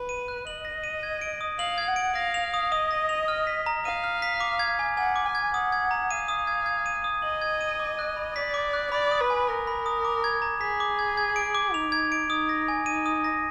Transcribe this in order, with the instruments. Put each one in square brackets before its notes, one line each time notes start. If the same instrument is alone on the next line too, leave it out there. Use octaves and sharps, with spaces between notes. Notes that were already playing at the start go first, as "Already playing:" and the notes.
Already playing: [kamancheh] B4
[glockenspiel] D#7
F#6
[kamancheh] D#5 [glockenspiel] F#7
[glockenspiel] A#6
D#7
G#6
D7
D#6
[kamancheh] F5 [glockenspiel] F#7
[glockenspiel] G#6
[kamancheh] F#5
[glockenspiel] D7
[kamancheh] F5 [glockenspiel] A#6
[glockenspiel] F7
D#6
[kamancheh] D#5 [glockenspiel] D#6
[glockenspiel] A#6
F7
F6
B6
A#5
[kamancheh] F5 [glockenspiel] D#7
[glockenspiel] F6
B6
D6
G#6
G#5
[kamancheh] F#5 [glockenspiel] G#5
[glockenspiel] D6
[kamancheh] G#5
[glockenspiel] G#6
[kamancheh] F#5 [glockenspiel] D#6
[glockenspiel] G#6
A#5
[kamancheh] F5 [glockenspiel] D#7
[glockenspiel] D#6
G#6
G#6
D#7
D#6
[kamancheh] D#5 [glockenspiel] F#7
[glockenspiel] G#6
D#7
D6
F#6
B5
[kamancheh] D5 [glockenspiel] B6
[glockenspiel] D6
F#6
[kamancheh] D5 [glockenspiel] B5
[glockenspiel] D#6
[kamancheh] B4
[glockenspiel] G#5
[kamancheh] A#4 [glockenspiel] A#6
[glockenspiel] B5
D#6
D6
G#6
A#5
[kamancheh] G#4 [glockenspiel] B6
[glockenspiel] D6
G#6
G#6
D7
D6
[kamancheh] D#4 [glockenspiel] F7
[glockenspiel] G#6
D7
[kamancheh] D#4 [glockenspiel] D#6
[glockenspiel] A#6
G#5
[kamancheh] D#4 [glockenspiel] D#7
[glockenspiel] D#6
A#6